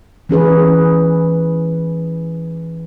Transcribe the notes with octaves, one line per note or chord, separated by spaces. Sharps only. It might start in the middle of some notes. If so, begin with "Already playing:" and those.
E3 C#4 G#4 B4